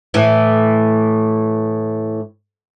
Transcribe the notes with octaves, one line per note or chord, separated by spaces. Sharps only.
A2 E3